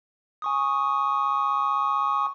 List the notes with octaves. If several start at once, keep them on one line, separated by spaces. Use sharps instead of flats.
G#5 C#6 D#6